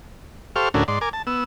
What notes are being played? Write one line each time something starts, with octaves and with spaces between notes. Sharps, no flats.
G4 A4 C5 F5 C#6 F6
D2 A2 C#4 D4 F#4 A#4
G#2 D5 C6
A#4 G#5 D6
A5
B3 E6